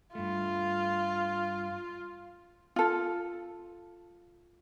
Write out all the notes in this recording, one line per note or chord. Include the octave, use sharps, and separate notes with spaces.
G2 A3 F4
F4 A4